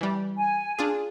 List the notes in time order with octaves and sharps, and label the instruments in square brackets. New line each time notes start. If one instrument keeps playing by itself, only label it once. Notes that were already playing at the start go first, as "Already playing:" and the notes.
[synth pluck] E3 G3
[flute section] G#5
[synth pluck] D4 F4 G#4